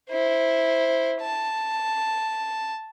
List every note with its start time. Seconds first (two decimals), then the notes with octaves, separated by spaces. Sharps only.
0.10 E4 C5
1.21 A5